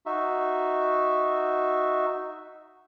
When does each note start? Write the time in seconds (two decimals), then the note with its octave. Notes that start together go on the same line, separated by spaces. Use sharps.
0.06 D#4 F#4 E5